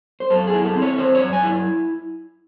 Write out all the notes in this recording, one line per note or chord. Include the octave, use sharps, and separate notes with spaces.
C5
F#2 A4
G#4
E4
A4
C4
C#5
E3 C5
C#5
F#2
G#5
E4